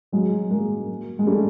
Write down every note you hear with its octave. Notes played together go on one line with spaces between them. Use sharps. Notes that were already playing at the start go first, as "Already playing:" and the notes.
F#3 G#3
G#3 A#3
G#3
G3 A3